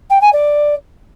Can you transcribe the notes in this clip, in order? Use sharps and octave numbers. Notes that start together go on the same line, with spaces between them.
G5
G#5
D5